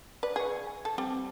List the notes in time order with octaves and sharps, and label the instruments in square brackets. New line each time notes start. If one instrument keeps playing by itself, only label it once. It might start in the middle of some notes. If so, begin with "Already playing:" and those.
[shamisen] B4 [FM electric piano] D5
[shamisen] G#4 [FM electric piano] G#5 C#6
[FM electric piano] G#5
[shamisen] A4
[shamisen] G3 [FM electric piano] C4